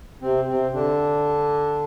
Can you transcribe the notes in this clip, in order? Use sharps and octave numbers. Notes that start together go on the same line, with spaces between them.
C3 C4
C3 C4
D3 D4